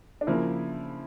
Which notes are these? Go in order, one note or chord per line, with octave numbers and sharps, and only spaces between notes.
D4
C#3 F3 A#3 E4